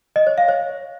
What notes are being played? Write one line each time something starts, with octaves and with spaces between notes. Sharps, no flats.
D#5
C#5
F5
C#5